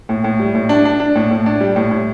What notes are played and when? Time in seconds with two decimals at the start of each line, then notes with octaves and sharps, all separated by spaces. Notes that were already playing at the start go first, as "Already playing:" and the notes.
0.09 A2
0.24 A2
0.40 G3
0.55 A2
0.69 D4
0.85 D4
1.00 D4
1.15 A2
1.31 A2
1.46 D4
1.61 G3
1.76 A2
1.91 A2